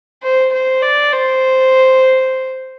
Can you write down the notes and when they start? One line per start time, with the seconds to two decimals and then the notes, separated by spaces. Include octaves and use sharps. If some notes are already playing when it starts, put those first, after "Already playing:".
0.22 C5
0.52 C5
0.82 D5
1.12 C5